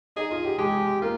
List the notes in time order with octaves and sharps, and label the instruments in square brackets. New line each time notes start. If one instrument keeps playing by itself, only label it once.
[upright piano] D#4 D#5 [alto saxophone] G#4
[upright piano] F4
G4
[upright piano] G#3 G#4 [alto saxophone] G4
[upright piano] A#3 A#4 [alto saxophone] F4